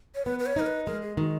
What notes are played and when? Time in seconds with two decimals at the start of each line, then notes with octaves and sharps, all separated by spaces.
0.15 C#5
0.25 B3 B4
0.39 B4
0.46 C#5
0.56 D#4 A#4
0.66 B4
0.86 G#3 A#4
1.02 G#4
1.17 D#3 F#4